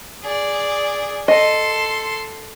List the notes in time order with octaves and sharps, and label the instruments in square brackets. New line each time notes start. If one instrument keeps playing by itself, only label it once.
[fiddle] G#4 D5
[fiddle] A4 C6 [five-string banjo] D#5